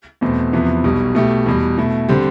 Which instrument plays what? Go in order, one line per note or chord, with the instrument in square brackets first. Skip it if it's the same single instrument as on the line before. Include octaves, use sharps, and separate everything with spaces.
[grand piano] E2 B2 A3 C4
E2 C3 F3 B3 E4
B1 B2 G3
B2 A3 E4 G4
E2 B2 G3
B2 A3 E4
D3 G3 C4 G4